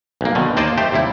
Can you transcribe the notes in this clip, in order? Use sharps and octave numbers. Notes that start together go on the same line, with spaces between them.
B1 A#3
B2 D3 D#3
D#2 A#3 C5 D5 D#5 A5
A3 G4 C5
D#2 C3 G3 E4